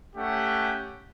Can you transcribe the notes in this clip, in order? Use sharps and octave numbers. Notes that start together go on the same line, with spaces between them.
A3 C#4 G4 F#5